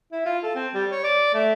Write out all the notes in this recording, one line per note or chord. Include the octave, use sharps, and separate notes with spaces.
E4
F4
A4
C4
G3
C#5
D5
A3